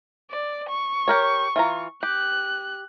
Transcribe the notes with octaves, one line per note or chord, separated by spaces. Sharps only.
D5
C#6
G4 A#4 C#5
E3 F4 A#5
G4 F#6